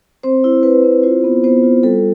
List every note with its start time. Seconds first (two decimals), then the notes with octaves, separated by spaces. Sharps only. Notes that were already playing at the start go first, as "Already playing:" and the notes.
0.23 C4 C5
0.44 E4
0.63 E4 B4
0.83 C4
1.03 F4 C5
1.24 B3
1.44 B3 C5
1.63 F4
1.83 G3 A4